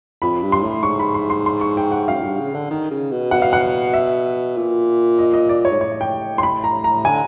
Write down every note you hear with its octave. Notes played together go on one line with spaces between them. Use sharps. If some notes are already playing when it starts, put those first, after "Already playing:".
F2 B5
G2
C6
A2
G#2 C#6
B5
C6
C6
C6
C#6
G5
F#5
F#2 F5
G2
C#3
D3
D#3
C#3
B2
B2 F#5
F5
F#5
E5
A#2
D#5
D#5
D5
C#5
G#2
A2 C#5
G5
C6
B5
A#5
A#5
D3 G#5